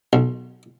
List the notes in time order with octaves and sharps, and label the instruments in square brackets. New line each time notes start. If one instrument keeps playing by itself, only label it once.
[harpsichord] B1